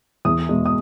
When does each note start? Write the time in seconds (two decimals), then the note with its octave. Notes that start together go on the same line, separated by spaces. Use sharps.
0.25 E2 D#6
0.49 B2 G#3
0.66 D#6